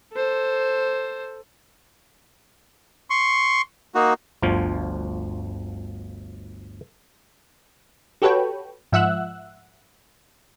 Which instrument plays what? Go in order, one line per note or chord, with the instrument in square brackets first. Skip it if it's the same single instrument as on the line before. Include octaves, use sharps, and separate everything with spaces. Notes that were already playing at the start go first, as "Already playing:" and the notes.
[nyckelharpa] A4 C5
[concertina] C6 C#6
A#3 D#4 F#4
[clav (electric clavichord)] G1 D2 F3 F4
[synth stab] F#4 G4 A4 B4 C#5 G5
G#2 F3 E5 F#5 E6 F#6